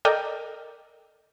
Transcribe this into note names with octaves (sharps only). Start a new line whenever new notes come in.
A4 A#4 D5 D#5 G5